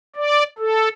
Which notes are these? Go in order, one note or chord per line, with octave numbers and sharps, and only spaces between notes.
D5
A4